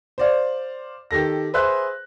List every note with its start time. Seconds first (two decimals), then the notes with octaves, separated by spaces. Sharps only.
0.18 C5 D5 F5
1.11 D#3 G4 A4 A#6
1.54 G#4 B4 C5 E5 C6 F#6